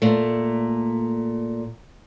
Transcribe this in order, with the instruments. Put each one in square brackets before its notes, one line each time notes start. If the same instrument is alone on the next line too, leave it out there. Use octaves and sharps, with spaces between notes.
[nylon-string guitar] A#2 A3